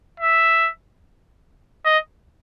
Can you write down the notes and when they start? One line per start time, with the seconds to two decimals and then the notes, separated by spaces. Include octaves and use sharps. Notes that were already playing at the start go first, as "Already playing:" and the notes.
0.20 E5
1.86 D#5